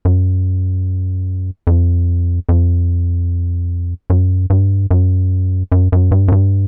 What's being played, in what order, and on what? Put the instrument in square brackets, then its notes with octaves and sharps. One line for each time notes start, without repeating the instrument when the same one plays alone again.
[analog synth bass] F#2
F2
F2
F#2
G2
F#2
F#2
F#2
G2
F#2
G2